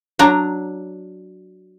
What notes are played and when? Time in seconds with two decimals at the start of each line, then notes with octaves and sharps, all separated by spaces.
0.19 F#3 D4 A#5